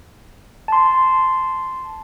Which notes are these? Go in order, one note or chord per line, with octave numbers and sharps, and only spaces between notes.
A5 C6